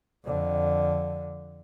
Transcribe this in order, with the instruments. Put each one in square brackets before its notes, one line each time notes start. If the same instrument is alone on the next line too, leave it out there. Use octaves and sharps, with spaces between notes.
[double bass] F2 D3